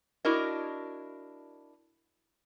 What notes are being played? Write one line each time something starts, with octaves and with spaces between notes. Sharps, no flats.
D4 E4 F#4 A#4 D#5